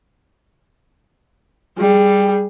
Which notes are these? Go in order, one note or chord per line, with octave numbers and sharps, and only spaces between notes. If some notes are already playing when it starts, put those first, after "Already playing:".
G3 G#4